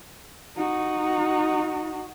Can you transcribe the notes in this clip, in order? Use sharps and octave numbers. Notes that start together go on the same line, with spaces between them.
D#4 F#4